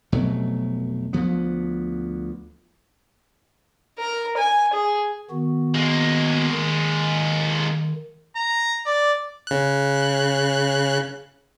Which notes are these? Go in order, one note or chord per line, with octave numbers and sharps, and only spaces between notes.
F1 B2 F#3 A3
D2 F3 B3
A#4
G#5
G#4
D#3 B3 F#4
G#3 A#3
D#3
A#5
D5
C#3 F#6